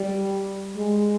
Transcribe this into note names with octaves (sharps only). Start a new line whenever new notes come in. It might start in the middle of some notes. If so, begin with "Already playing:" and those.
Already playing: G3
G#3